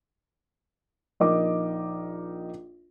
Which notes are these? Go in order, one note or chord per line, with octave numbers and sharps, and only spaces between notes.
A#1 D#4 A#4 D#5 D6